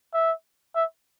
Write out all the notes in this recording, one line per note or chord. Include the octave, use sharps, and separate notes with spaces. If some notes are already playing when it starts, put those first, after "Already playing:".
E5
E5